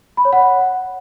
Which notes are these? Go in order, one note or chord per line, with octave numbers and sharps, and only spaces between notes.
B5
C#5
F#5